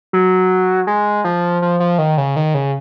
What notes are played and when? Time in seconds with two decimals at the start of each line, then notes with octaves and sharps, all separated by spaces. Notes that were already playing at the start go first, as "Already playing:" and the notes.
0.13 F#3
0.87 G#3
1.24 F3
1.62 F3
1.80 F3
1.98 D#3
2.18 C#3
2.36 D#3
2.54 C#3